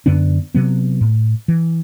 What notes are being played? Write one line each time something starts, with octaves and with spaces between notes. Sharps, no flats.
F#2 D3 B3 D4
C3 F#3 B3
A2
E3